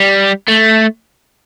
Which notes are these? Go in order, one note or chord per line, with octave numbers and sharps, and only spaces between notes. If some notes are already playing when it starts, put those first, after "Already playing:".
Already playing: G3
A3